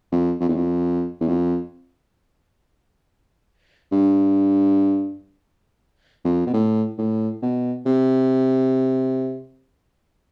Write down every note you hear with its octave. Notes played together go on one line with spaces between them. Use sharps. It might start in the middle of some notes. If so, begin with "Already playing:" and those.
F2
F2
E2
F2
E2
F2
G2
F2
B2
A2
A2
B2
C3